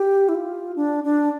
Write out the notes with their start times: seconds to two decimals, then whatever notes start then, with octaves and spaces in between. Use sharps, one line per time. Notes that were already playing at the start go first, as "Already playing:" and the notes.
Already playing: G4
0.29 E4
0.34 F4
0.76 D4
1.04 D4